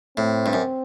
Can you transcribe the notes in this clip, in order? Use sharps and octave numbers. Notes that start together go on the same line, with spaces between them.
A2 C4
G2
F#2